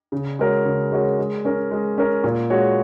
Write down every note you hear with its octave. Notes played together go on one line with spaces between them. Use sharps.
C#3
G#3 F#4 A#4 C#5
C#3
G#3 F#4 A#4 C#5
G#3
C#4 A#4
G#3
C#4 A#4
A#2
G#3 F#4 C#5